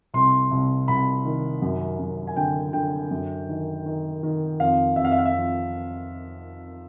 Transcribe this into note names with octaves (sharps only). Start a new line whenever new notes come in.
C2 C6
C2
C2 B5
D#3
F#2
F#2
G#5
D3 G5
D3 G5
F#2
D#3
D#3
D#3
F2 F5
F2 E5
F5
E5
F5
E5
F2